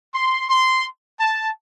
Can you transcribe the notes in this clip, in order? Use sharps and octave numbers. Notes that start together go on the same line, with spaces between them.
C6
C6
A5